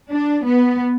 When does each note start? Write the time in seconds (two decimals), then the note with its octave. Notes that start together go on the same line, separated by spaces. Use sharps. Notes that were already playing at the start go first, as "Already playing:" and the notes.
0.11 D4
0.45 B3